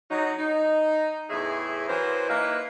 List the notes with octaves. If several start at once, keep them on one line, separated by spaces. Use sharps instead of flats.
F#3 D#4
D#4
E2 A2 G#4 E5
E3 F#3 A#4 C5
A#3 D#4 E4 B4 F5